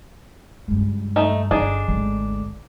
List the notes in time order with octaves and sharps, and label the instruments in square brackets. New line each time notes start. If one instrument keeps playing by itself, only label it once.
[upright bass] C#2 G2
[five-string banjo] A3 D#4
[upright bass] G1 [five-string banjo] D4 D#4 G#4
[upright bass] G#1 D2